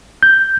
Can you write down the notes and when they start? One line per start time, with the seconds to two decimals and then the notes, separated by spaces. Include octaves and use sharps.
0.23 G6